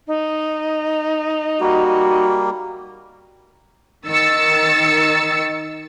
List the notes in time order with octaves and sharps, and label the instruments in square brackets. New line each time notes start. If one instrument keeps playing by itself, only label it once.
[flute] D#4
[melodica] G3 A#3 [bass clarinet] F#4
[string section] D#3 E6 A6 C#7